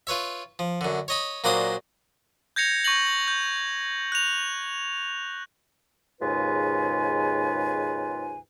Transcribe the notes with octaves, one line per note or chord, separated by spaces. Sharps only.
F4 B4 C#5 E5
F3
F#2 D3
C#5 D#5 B5
A#2 F#3 A#3 D4 C5 D#6
G6 G#6 A#6 C#7 F7
C#6 G6 A#6 F#7
G6
F#6 F7
D#2 G#2 C#3 F4 B4 G#5